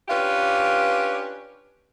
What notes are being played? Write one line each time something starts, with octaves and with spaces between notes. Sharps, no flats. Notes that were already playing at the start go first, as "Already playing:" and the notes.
C#4 D4 F4 G4 B4